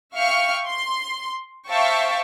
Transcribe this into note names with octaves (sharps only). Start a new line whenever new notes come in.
E5 F5 G5 C#6 F6 C#7
C6
C5 E5 F5 G5 A5 C#6